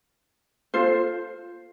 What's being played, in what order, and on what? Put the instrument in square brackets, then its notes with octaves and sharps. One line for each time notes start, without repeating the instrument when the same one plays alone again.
[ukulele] F4 A4 C5